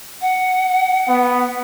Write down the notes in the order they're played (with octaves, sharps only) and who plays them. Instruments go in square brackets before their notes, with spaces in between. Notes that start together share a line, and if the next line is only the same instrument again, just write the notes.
[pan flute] F#5
[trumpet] B3